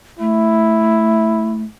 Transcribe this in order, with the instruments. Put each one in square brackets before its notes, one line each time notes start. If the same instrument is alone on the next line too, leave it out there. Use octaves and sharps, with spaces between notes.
[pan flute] A3 [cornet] E4